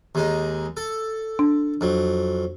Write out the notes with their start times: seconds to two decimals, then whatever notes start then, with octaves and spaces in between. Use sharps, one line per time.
0.15 D#2 G#3 D#4
0.77 A4
1.39 D4
1.81 F2 F#3